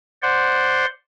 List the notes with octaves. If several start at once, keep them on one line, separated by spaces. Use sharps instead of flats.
C5 D5 F#5 C6